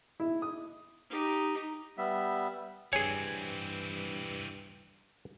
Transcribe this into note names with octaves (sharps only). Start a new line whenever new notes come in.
E4
D#6
D#4 G4
G3 B3 E5
G2 E3 C4 G#4 C#5 G#5